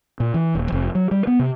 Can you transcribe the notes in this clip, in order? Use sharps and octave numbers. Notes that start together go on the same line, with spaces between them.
A#2
E3
D#1
F1
F#3
G3
B3
C3